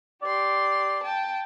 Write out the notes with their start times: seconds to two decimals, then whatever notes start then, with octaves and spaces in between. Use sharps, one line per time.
0.22 G4 D5 C6
1.02 G5 A5